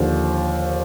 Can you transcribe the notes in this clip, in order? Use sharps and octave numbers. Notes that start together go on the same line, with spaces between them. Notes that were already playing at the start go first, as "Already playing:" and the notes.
Already playing: D#2 D3 F3 C5